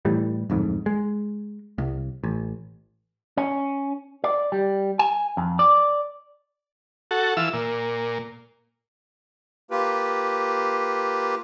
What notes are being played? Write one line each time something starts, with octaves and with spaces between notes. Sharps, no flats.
A2 E3 G3
D1 F2 G#2
G#3
C2
A1
C#4
D5
G3
G#5
F2
D5
F#4 A4
E3 F4 E6
A#2
A#3 F4 G4 B4